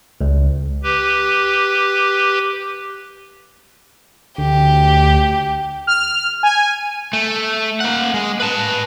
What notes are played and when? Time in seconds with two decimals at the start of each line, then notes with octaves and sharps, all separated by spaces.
0.21 C#2
0.83 G4 B4
4.38 D2 G4
5.87 F6
6.43 G#5
7.13 A3
7.80 A#3 F#5
8.14 G#3
8.40 B4 A5